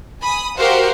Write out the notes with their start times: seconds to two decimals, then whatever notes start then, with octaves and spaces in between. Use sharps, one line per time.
0.22 G#5 B5 D#6
0.56 F#4 G4 A#4 C5 F5 F#5